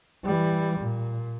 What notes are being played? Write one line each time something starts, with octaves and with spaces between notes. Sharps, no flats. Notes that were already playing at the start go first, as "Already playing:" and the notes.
E3 G3
A#2